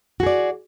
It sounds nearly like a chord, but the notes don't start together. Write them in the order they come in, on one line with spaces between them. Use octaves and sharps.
F#4 G#4 D5